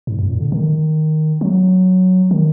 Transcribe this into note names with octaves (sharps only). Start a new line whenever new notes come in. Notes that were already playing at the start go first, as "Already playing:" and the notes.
G#2
F#2
A#2
D3
D#3
F#3
D#3